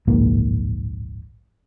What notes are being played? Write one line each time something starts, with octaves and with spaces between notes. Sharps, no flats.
D1 A#1 G#2 A#3